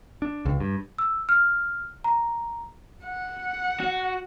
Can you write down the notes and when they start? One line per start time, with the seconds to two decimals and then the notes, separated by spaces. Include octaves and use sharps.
0.22 D4
0.45 C#2
0.60 G2
0.98 E6
1.29 F6
2.04 A#5
3.04 F#5
3.80 F#4